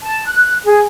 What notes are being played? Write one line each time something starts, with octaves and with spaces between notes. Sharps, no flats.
A5
F#6
G#4